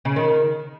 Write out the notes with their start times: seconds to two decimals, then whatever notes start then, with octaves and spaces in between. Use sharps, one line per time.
0.05 C#3
0.16 D#3